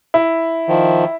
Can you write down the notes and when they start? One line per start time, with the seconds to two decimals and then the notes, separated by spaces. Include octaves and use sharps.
0.14 E4
0.68 D#3 F3